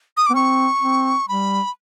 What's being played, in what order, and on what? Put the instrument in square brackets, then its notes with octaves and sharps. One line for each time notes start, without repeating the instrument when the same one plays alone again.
[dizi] D#6
[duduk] B3 [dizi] D6
[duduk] C4 [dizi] C#6
[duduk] C4
[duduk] G3 [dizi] B5